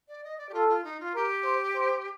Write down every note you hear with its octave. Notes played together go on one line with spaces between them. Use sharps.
D5
D#5
D5
G4
F4 A4
F4
D#4
F4
G4 A#4
C5
C5